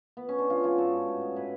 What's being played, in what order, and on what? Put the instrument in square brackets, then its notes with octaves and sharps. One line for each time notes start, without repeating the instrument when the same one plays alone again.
[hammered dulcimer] B3
C#4
D4
G#3 C#4 F4
G#3 F4 G#4
G#2 F#4 A4
G#2
A2
G#3
A2 G#4 B4